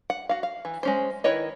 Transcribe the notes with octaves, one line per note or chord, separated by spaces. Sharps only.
F#5
F#4 F5
F5
E3
G#3 C#4 C5
D#3 E4 B4 C#5 D#5